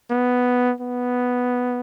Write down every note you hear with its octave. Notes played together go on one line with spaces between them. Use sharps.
B3
B3